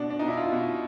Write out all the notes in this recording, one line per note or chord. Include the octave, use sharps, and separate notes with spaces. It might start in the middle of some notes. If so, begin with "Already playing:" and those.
Already playing: B2 D4
D4
B2 D#4
E4
F4
B2